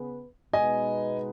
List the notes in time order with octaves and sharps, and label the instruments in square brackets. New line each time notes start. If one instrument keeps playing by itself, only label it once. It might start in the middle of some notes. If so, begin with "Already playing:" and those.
Already playing: [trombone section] C#3 B3 G#4 B4
[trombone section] B2 G#3 B3 D#4 B4 [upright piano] D#5 G#5